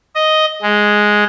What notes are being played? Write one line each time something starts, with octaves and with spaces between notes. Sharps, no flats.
D#5
G#3